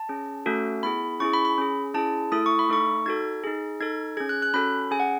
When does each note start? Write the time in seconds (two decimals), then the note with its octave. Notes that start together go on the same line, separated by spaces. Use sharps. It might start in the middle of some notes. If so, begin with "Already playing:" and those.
Already playing: A5
0.09 C#4 G#4
0.46 A3 C#4 F#4 A4
0.83 B3 E4 G#4 B5
1.20 C#4 E4 G#4 C#6
1.33 B5
1.45 B5
1.58 C#4 G#4
1.94 C#4 E4 G#4 A5
2.32 A3 E4 A4 D#6
2.46 C#6
2.59 B5
2.69 A3 D#4 A4 C#6
3.06 D#4 F#4 A4 G#6
3.44 D#4 G#4
3.80 D#4 A4 G#6
4.17 C#4 G#4 G#6
4.29 F#6
4.42 F#6
4.54 C#4 F#4 A4 B5
4.91 C#4 G#4 G#5
5.00 F#5